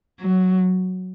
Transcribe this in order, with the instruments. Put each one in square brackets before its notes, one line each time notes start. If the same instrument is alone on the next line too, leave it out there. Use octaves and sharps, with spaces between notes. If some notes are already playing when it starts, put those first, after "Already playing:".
[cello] F#3